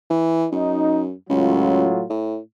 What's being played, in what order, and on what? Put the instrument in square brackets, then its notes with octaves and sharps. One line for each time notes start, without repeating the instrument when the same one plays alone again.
[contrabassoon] E3
[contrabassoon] F#2 [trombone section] D#4
[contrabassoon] C#2 [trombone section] A2 F#3 F4
[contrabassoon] A2